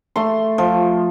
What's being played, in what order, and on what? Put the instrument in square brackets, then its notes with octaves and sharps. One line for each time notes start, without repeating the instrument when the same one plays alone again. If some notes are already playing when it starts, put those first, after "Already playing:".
[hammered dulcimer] A3 C6
F3